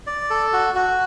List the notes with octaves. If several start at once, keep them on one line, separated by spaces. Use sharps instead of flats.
D5
A4
F#4
F#4